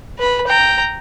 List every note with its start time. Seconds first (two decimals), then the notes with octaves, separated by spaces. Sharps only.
0.18 B4 B5
0.47 G5 A#5